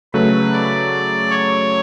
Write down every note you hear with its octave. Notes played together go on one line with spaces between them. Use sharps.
C#3 F#3 A3 B4
D5
C#5